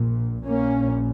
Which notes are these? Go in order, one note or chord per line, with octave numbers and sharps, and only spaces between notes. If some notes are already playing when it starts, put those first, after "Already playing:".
Already playing: A#1 A#2
A#1 A#2 A#3 C#4